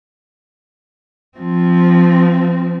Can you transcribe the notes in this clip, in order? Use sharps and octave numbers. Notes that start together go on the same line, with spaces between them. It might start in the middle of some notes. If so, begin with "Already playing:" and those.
F3 C4